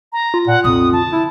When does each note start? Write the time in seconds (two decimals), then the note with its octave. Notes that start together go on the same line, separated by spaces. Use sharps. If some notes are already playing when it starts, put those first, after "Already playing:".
0.13 A#5
0.34 F4
0.47 A#2 F#5
0.64 B1 F2 A#2 D#6
0.93 D3 F3 A5
1.13 E4